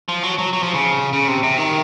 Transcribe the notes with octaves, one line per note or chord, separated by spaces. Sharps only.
F3
F#3
F#3
F#3
F3
C#3
C#3
C3
C3
D#3